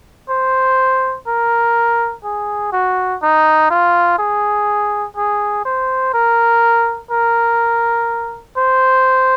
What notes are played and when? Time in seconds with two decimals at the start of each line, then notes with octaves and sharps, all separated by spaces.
0.29 C5
1.27 A#4
2.24 G#4
2.72 F#4
3.22 D#4
3.70 F4
4.18 G#4
5.16 G#4
5.65 C5
6.13 A#4
7.10 A#4
8.57 C5